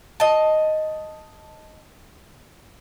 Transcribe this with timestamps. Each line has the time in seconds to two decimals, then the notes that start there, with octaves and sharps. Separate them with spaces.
0.20 D#5 A5